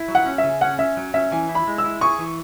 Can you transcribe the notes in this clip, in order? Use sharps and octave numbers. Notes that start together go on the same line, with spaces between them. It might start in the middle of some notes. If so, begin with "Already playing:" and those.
Already playing: E4
F#3
F#5
C#4
E5
C#3
C#4 F#5
C#4 E5
F#3
C#4 E5
E3 G#5
E4
B5
G#3
E6
E4
G#4 C#6
E3